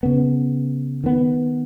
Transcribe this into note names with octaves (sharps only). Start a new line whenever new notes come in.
C#3 B3
D#3 B3